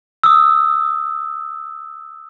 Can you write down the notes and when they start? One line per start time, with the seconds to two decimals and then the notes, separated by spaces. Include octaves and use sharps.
0.24 D#6 E6